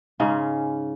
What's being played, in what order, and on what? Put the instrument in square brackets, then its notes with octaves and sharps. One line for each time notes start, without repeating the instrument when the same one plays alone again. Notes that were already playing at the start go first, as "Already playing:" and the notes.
[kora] G#2 C#3 C#4 C5